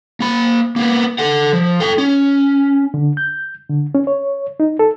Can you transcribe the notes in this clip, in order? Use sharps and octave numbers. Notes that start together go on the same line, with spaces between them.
A#3 B5
A#3 B3
A4 F#5
F3
A4 G5
C#4
D3
G6
D3
C#4
C#5
D#4
A4